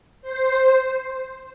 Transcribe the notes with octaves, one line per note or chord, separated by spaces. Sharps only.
C5